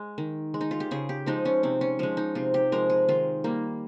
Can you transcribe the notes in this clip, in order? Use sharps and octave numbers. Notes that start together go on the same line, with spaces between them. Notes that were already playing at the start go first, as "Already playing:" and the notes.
Already playing: G#3
D#3
G#3
D#4
F4
G4
C#3 G#4
G4
F3 G#3 D#4
C#4
C3 C4
C#4
F3 G#3 C#4
D#4
C3 F4
G4
F3 G#3 A#4
G#4
D#3 F4
G3 A#3